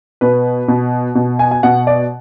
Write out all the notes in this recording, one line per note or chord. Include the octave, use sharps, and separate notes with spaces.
B2 B4
B2
B2
G#5
G#5
B2 F#5
D5